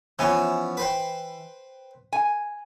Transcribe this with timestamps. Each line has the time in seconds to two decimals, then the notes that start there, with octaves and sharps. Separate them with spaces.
0.19 E3 F3 B3 C#4 G#5
0.77 B4 C5 G5
2.13 G#5